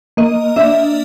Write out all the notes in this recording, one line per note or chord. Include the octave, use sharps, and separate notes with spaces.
A#3 D#5
D4 E5